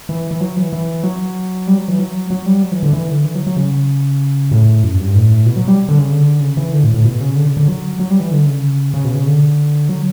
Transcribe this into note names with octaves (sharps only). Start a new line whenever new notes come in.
E3
E3
F#3
E3
E3
F#3
G3
F#3
E3
F#3
F#3
G3
F#3
E3
D3
E3
D3
E3
F#3
F#3
C#3
A2
F#2
G2
A2
B2
F#3
G3
D3
C#3
D3
C#3
E3
D3
A2
A2
B2
C#3
D3
C#3
D3
F#3
F#3
G3
E3
D3
C#3
C#3
B2
C#3
D3
F#3